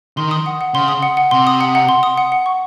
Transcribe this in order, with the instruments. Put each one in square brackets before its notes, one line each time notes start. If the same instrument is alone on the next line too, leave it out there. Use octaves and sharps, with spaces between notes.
[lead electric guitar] D#3 [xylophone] C6
[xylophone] D#6
F#5
F#5
[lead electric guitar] C#3 [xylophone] C6
[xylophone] D#6
F#5
F#5
[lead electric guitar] C3 [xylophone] C6
[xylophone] D#6
F#5
F#5
C6
D#6
F#5
F#5
C#6